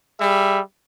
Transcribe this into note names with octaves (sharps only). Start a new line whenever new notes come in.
G3 G#4 E5